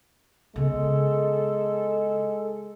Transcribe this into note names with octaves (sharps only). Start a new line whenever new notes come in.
C#3 G#3 B3 A4